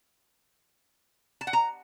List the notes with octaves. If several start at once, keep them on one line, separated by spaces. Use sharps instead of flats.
A5
F#5
A#5